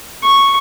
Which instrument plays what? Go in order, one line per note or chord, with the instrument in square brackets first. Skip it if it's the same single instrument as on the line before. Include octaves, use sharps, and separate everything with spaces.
[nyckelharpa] C#6